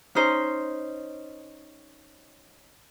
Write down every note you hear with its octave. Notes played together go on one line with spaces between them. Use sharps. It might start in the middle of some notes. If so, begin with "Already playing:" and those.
C#4 D#4 C5